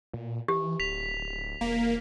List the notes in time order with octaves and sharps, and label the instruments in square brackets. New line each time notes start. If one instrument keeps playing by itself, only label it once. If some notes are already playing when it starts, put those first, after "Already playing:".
[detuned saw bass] A#2
[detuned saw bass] E3 [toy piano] G4
[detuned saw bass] D1 [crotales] B6 F7
[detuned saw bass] E1 [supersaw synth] A#3